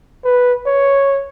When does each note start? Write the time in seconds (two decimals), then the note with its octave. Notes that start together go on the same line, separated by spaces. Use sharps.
0.25 B4
0.66 C#5